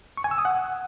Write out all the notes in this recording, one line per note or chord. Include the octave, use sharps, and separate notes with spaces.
C#6
G#5
E6
D#6
F#5